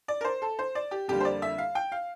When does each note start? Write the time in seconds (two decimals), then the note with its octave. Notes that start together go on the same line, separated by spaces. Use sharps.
0.08 D5
0.21 A#4
0.24 C5
0.42 A4
0.59 C5
0.75 D5
0.91 G4
1.08 F2 D3 G3 A#3 G4
1.20 C5
1.25 D5
1.42 E5
1.58 F5
1.75 G5
1.92 F5